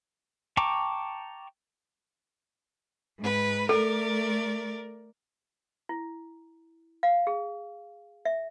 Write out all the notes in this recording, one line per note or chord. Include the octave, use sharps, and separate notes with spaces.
G5 A5 A#5 C#6 D6
G#2 B4
A3 A4 A#4 D5
E4
F5
G#4
E5